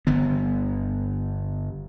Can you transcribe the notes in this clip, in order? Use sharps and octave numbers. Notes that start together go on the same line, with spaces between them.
G1 D3 B3